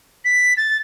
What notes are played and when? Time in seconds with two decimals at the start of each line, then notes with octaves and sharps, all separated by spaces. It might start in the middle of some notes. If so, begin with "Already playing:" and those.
0.25 B6
0.57 A6